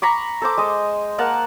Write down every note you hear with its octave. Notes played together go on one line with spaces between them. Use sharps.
A#5 B5 C#6 D6
A4 C5 D6
G#3 D#5
A#3 A#4 F#5 A5